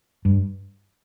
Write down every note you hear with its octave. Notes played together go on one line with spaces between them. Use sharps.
G2